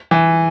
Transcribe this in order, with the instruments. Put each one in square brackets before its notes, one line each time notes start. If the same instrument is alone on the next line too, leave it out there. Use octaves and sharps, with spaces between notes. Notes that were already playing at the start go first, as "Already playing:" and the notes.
[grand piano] E3